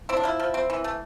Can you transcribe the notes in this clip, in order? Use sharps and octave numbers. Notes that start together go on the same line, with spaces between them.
C4 E4
D4
F3 E4
F3
C4
E3
A3